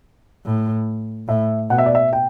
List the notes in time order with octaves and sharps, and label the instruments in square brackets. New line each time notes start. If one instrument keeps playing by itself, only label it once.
[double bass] A2
[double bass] A2 [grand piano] E5
[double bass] B2 [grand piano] F#5
[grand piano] E5
D5
E5
G5